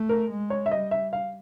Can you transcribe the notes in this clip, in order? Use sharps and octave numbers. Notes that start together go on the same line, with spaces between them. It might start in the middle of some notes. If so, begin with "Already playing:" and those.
Already playing: A3
A#4
G#3
C#5
E5
G3 D#5
E5
F5